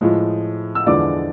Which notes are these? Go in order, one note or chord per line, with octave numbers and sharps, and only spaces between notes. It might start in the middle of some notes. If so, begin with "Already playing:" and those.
A2 F3 G#3
E6
E2 D3 F3 G#3 D5 D6